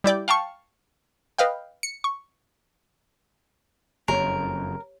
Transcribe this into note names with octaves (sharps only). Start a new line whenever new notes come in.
G3 E4 D5 G5
F5 G5 A5 C#6
B4 D#5 F5 G5
C#7
C#6
F#1 F2 G4 A#4 C#5